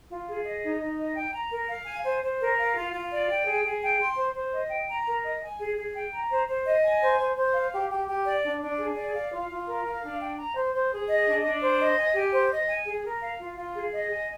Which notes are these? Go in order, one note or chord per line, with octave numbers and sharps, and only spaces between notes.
F4
G#4
D#5
D#4
D#4
D#5
G5
A#5
A#4
F5
G#5
C5
C5
A#4
F5
F4
F4
D5
G5
G#4
G#4
G5
C6
C5
C5
D#5
G5
A#5
A#4
D#5
G#5
G#4
G#4
G5
A#5
C5
C5
D#5
G#5
C5
C5
C5
F5
G4
G4
G4
D5
D4
D4
G#4
D5
F5
F4
F4
A#4
F5
D4
G5
A#5
C5
C5
G#4
D#5
D4
D4
C5
D#5
G#5
G4
C5
D#5
G#5
G#4
A#4
F5
F4
F4
G#4
D#5
G#5